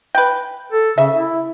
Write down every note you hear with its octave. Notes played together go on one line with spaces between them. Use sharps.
B4 G5
A4
C#3 E5
E4